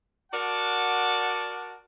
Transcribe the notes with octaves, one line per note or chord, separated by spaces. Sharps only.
F#4 A#4 D5 F#5 A5